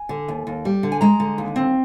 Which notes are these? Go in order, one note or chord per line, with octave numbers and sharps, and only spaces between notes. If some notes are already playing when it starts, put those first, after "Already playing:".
Already playing: G#5
D3
D#2
D#2
G3
D3
G#5
G#3 A#5
D3
D#2
C4